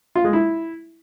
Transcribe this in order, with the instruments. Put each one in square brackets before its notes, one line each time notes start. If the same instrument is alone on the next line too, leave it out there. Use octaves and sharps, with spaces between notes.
[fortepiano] F4
G#3
E4